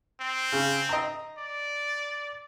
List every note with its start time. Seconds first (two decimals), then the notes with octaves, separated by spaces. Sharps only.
0.21 C4
0.52 C#3
0.89 D#5 A#5
1.38 D5